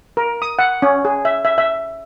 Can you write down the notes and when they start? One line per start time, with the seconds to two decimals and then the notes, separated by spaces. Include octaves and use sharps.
0.17 A#4
0.42 D#6
0.59 F#5
0.82 C#4
1.05 G#4
1.25 E5
1.45 E5
1.58 E5